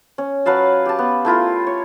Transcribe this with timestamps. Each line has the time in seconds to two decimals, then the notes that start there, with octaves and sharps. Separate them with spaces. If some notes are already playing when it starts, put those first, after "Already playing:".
0.18 C#4
0.46 F#3 B4 F5 A5
0.86 G4 A5
0.99 B3
1.25 A3 E4 F4 A#4
1.67 C#5